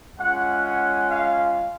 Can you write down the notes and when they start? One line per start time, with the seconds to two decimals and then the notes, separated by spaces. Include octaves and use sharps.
0.19 G#3 C#4 F4 F#5
0.64 F#5
1.10 F5